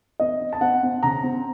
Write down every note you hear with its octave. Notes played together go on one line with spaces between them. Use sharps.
C4 D#5
C4
A5
C4 F#5
C4
C#3 A#5
C4